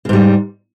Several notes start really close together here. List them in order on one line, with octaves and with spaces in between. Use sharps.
C#3 G#2 G3